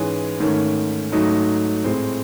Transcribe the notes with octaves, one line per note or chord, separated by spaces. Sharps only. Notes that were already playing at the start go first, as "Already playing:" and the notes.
Already playing: G#2 E3 G#3 C#4
G#2 D#3 A3 C#4
G#2 F#3 A3 D#4
A2 G#3 C4